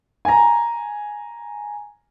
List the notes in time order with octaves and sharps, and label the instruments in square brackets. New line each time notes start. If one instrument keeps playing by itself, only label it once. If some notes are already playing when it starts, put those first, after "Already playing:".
[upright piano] G#5 A#5